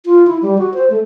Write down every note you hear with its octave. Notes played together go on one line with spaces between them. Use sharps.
F4
E4
G3
F#4
C5
A3